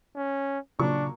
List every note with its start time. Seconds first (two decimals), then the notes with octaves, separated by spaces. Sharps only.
0.16 C#4
0.80 A#2 C#3 F#3 D4 C#6